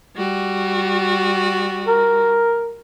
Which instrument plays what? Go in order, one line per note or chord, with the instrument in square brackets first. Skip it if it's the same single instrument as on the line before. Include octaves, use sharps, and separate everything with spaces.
[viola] G3 F#4
[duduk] A#4